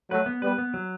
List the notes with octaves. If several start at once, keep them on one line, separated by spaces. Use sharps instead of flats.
F#3 A3 B4
B3
G3 B3 B4
B3
F#3